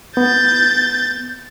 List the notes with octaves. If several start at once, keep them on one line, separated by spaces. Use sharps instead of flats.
B3 G6 A6